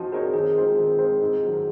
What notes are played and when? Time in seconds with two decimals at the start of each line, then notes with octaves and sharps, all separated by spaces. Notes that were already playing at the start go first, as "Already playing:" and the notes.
Already playing: F3 C4 D#4 F#4
0.12 C4 D#4 G#4 A#4 C#5
0.33 D#3 G#4
0.55 G#3 C4 F4
0.78 D#3
0.98 G#3 C4 F4
1.21 G#2
1.43 D#3 F#3